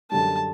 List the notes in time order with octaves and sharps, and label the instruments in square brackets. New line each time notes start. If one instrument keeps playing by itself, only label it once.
[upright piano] F#2 D3 G3 [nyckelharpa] A5